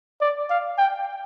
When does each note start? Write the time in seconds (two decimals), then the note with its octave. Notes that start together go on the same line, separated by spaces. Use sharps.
0.21 D5
0.50 F5
0.78 G5